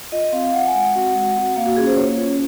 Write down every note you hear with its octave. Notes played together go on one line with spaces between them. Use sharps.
F4 D#5
C4 F5
F5
F4 F#5
G#5
G#3 F#5
C4 F#4 F#5
G#3
C4 F#4
A#3 F5
F#4
C#4 F4 G#4
C5
A#3 C#5
C#4 F4